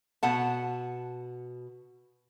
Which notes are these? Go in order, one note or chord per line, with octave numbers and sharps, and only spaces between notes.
B2 F#5 A5